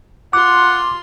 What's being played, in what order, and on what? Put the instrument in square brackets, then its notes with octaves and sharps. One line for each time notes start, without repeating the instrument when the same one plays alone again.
[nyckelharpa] F4 C6 [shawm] F#5 [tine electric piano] D6